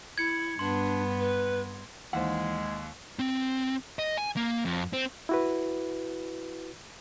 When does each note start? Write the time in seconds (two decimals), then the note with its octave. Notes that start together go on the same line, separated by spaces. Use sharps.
0.18 E4 G#6 C#7
0.59 G2 B3 D4 C6
1.20 B4
2.13 D#2 E3 G#3 C5 F#5
3.19 C4
3.99 D#5
4.17 G#5
4.36 A#3
4.65 F2
4.93 C4
5.29 E4 F#4 B4